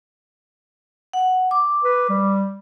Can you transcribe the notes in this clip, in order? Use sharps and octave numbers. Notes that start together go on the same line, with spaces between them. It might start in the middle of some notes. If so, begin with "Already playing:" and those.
F#5
D6
B4
G3